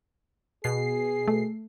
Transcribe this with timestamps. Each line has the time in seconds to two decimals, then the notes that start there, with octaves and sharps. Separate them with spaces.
0.64 B2 G#4 C7
1.28 A3